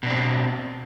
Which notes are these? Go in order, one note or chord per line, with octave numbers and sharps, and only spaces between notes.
B2 C4 D4